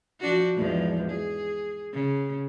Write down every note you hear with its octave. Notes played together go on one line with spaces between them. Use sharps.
F3 D4 F#4
E2 G#2 F3
G#4
C#3